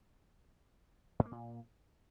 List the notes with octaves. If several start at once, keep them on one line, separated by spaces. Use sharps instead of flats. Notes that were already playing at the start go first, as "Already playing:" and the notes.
G#2
A#3
A#2